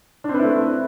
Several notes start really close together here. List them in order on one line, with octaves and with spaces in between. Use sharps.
D4 C4 B4 E4 A3